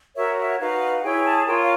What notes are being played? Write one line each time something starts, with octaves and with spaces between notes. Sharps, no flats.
F#4 A#4 C#5 E5
E5
D#4 F#4 B4 F5
E4 G#4 C#5 G5
A5
F4 A#4 C#5 G5
F5